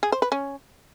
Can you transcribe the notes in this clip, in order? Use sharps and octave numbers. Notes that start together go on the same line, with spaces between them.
G#4
C5
B4
C#4